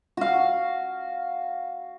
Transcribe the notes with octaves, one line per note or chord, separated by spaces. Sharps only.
F#4 F5